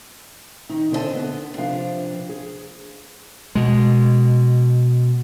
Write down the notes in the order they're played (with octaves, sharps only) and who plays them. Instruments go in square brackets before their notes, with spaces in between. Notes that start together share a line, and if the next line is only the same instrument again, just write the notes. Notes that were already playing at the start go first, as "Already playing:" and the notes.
[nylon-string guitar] D#3 D#4
D3 C4 E4 F4 D#5 A5
D3 B3
C3 F3 D4 B4 F5
G#4
[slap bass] B2 G#3